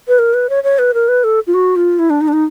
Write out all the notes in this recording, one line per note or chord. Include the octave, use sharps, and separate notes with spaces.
B4
A#4
B4
C#5
C#5
B4
A#4
B4
A4
F4
F#4
F4
E4
D4
D#4
D4
D#4